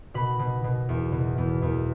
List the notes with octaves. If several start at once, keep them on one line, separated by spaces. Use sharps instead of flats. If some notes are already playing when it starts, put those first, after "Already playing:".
B2 B5
B2
B2
E2
B2
E2
E2